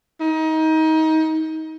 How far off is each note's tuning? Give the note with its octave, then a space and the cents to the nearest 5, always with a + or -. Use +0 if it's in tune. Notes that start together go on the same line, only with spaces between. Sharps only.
D#4 +25